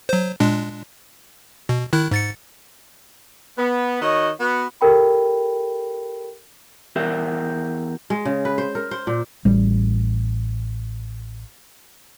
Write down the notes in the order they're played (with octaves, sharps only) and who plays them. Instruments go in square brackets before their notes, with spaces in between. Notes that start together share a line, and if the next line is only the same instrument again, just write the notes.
[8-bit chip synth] F#3 C5
A#2 G#3 D4
B2
D#3 E4 F#6
G#2 A6 C#7
[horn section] B3
D#3 F#4 C#5 D#5
B3 F#4
[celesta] G4 A4 A#4 G5 B5
[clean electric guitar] E2 G4 A#4 E5
[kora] G#3
C#3
B4
C5
A#4
C5
A#2
[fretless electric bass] A1 G3